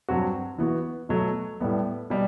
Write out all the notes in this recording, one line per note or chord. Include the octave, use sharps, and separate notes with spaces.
G2 F#3 C4 F#4
E3 B3 F#4
B2 F#3 A3
A2 G3 B3
B2 G3